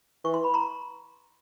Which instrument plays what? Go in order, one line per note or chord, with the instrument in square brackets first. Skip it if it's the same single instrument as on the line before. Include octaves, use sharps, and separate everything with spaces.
[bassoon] E3 [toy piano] C#6
[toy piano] C6
B5
A#5 C6